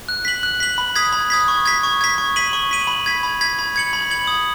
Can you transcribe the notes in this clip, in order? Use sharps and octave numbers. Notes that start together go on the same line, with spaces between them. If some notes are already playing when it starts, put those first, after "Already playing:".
F#6
B6 F#7
F#6
B6 F#7
B5
D#6 G#6 B6
B5
D#6 G#6 B6
C#6
G#6 B6
C#6
G#6 B6
C#6
B6 D#7 F#7
C#6
B6 D#7 F#7
B5
G#6 B6
B5
G#6 B6
B5
G#6 C#7 F#7
B5
G#6 C#7 F#7
D#6